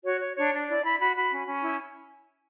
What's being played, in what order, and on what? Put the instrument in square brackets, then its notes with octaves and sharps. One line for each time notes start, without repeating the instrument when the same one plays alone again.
[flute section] F#4 C#5
C#5
D4 C#5
D4
E4 D5
E4 B5
F#4 B5
F#4 B5
C#4
C#4
E4